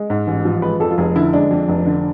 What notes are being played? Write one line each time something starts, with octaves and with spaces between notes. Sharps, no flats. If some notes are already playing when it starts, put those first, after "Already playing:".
Already playing: G#3
G#2
A1
F3
G#3 B4
F2 A4
F4
F1 G#4
D3 E4
G#3 D4
F2
F1
D3